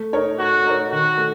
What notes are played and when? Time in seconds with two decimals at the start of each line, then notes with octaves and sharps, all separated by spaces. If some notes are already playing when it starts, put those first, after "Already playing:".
Already playing: A3
0.13 D#4 A#4 C#5
0.39 A3 F#4
0.66 D#4 A#4 C#5
0.91 D#3 F#4
1.18 A3